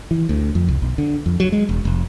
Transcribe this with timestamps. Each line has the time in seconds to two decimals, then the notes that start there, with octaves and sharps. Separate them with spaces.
0.11 E3
0.29 D2
0.55 F2
0.69 C2
0.82 B1
0.98 D3
1.26 F2
1.40 F#3
1.52 G#3
1.69 E1
1.85 F1